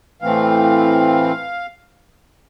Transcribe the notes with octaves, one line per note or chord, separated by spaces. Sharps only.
A2 E3 A3 C4 F5